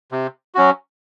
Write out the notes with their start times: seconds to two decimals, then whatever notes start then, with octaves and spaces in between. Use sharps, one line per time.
0.12 C3
0.55 F#3 C#4 F#4